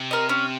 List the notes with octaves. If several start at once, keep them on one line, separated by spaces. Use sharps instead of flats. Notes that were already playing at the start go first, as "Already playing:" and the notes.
Already playing: C3
A#4 D#5
C#4